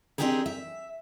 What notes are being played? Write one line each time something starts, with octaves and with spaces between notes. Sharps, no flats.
C4 D4 D#4 G4 G#4 A#4
E5